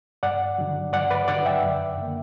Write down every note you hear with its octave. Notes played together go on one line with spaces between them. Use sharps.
G2 D5 F#5
D3 F#3
G2 D5 F#5
B4 D5
D3 F#3 D5 F#5
E5 G5
F#2
D3 A#3